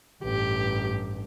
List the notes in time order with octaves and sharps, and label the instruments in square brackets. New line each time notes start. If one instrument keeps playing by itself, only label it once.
[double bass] A1 G2 [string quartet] G4